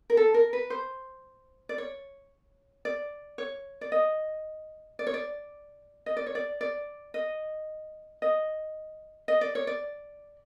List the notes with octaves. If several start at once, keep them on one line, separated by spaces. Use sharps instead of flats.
A#4
A4
A#4
B4
C5
D5
C#5
D5
C#5
D5
D#5
D5
C#5
D5
D#5
D5
C#5
D5
D5
D#5
D#5
D#5
D5
C#5
D5